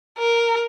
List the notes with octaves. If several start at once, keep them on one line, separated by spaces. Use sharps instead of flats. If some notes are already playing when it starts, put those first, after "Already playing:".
A#4